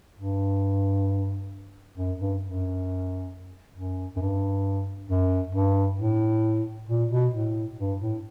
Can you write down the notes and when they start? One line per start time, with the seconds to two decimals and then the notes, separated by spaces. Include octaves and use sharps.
0.19 G2
1.97 F#2
2.20 G2
2.42 F#2
3.75 F#2
4.16 F#2
4.21 G2
5.10 F#2
5.55 G2
6.00 A2
6.89 A#2
7.11 B2
7.34 A2
7.79 G2
8.01 A2